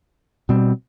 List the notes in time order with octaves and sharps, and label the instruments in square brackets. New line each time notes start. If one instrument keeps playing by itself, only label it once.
[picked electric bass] B2 G3 C4